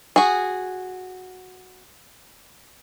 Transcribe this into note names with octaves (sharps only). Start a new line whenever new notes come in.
F#4 G#4